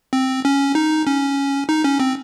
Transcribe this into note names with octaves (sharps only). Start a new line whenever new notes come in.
C4
C#4
D#4
C#4
D#4
C#4
C4